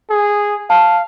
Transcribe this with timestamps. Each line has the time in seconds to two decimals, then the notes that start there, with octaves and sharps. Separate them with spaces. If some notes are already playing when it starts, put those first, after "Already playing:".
0.10 G#4
0.70 F5 A5